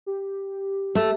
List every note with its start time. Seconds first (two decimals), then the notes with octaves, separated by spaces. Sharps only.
0.06 G4
0.95 A3